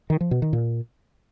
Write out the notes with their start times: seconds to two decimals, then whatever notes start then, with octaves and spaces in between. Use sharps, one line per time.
0.10 D#3
0.21 F3
0.31 B2
0.42 D#3
0.53 A#2